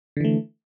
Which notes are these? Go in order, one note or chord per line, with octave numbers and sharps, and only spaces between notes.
D3 E3 A3